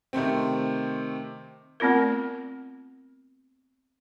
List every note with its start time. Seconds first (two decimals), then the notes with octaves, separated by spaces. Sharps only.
0.13 C3 D#3 A3 C4
1.80 A3 B3 C4 F4 A#4